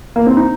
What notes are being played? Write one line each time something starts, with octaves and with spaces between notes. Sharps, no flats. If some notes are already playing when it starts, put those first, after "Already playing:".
A#3
C4
D#4